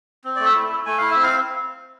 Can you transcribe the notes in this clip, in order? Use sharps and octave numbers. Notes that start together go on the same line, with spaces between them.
C4
A3 D5
E5
E4
A3
A3 G#5
E4 F5
E5
C4
F5